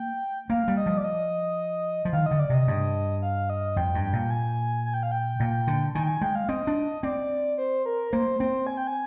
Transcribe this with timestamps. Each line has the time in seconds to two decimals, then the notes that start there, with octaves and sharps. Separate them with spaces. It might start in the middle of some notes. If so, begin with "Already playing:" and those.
Already playing: A#3 G5
0.49 A#3 F5
0.68 G3
0.77 D#5
0.86 F3
0.97 D5
1.04 D#5
2.05 F3
2.12 D#3 F5
2.26 D3 D#5
2.39 D5
2.50 C3 D#5
2.67 G2
3.22 F5
3.50 D#5
3.76 F2 G5
3.95 G2
4.04 G5
4.13 A#2
4.30 G#5
4.85 G#5
4.94 G5
5.03 F5
5.11 G5
5.40 A#2
5.67 D3
5.94 D#3 G#5
6.03 G5
6.08 G#5
6.21 G#3 G5
6.35 F5
6.49 C4 D#5
6.67 D4
7.03 C4 D5
7.58 C5
7.86 A#4
8.13 A#3 C5
8.40 C4 C5
8.67 G#5
8.77 G5
8.87 G#5